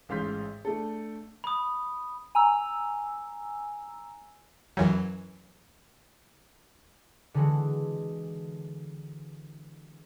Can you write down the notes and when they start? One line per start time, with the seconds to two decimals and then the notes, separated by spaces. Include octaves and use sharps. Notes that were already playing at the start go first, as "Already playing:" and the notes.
0.09 A1 G#2 F5 C6 G6 B6
0.65 A3 D4 A4
1.44 B5 D#6
2.35 G#5 A#5 E6
4.77 F#2 E3 F#3
7.34 D3 E3 G#3 F#4